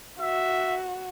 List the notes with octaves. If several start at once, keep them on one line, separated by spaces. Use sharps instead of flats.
F#4 E5